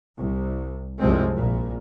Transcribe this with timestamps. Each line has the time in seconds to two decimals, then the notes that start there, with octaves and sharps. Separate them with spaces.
0.18 C2
0.99 C2 F#2 C3 F3 G#3 C4
1.35 A#1 A#2